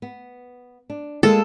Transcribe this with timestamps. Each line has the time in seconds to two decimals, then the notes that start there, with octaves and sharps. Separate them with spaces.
0.02 B3
0.90 D4
1.23 G#3 A#3 F4 A4